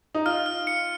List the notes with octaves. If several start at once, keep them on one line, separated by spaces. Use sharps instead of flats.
D#4
F4 F6
F6
C#7